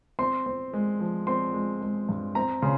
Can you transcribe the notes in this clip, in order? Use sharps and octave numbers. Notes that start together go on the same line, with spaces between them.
C4 C6
C4
G#3
F3
C4 C6
G#3
G#3
G2
C4 A#5
C#3 C6